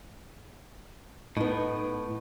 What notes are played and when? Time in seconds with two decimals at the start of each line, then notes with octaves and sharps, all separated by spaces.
1.37 A2 B3 D#4